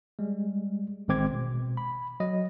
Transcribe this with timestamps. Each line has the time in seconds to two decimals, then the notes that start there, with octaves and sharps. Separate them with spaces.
0.19 G3 G#3
1.08 A1 D#3 G#3 C4 D6 G#6
1.31 B2
1.77 B5
2.20 F#3 D#5